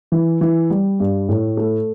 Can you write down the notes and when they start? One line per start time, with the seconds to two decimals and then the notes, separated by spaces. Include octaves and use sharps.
0.12 E3
0.41 E3
0.70 G3
1.00 G2
1.29 A2
1.57 A3